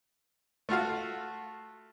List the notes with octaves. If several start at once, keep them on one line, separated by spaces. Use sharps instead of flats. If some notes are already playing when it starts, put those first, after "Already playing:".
A3 F4 F#4 F5